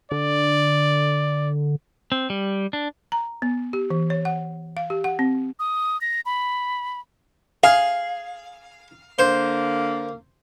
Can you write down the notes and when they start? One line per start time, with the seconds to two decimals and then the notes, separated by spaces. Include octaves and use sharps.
0.12 D3 D5
2.12 C4
2.30 G3
2.73 D4
3.12 A#5
3.42 B3
3.73 G4
3.90 E3
4.10 C#5
4.25 F#5
4.77 F5
4.90 G4
5.04 F#5
5.19 C4
5.59 D#6
6.01 A#6
6.26 B5
7.63 G#4 F5
9.19 D3 A#3 C5